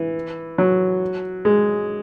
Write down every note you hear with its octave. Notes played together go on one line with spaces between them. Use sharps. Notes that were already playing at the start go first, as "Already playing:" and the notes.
Already playing: E3
F#3
G#3